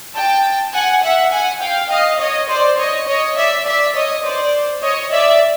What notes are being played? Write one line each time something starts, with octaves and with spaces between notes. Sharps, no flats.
G5 A5
F#5 G#5
E5 F#5
F#5 G#5
F5 G5
D#5 F5
C#5 D#5
C5 D5
C#5 D#5
C#5 D#5
D5 E5
D5 E5
C#5 D#5
C5 D5
C#5 D#5
D5 E5